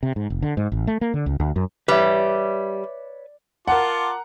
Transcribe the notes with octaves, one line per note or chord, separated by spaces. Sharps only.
C3
G#2
F1
D3
G#2
A1
A3
A#3
D3
C#2
D2
F#2
G3 B4 C#5 E5
F4 A#4 F#5 A5 D6